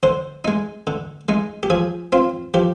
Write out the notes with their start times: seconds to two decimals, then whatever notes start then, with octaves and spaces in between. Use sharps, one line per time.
0.03 D3 C5
0.45 G#3 D#4
0.87 D3
1.29 G#3 D#4
1.63 G4
1.70 F3 G#4
2.12 C4 F4
2.54 F3 G4